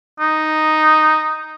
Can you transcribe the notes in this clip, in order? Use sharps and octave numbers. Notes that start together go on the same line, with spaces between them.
D#4